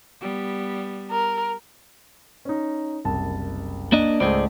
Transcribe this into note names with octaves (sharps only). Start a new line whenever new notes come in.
G3 B3
A#4
C#4 D#4
F#1 C2 A5
A#3 D4 D#5
C#2 G#2 A3 G#4 C5 D5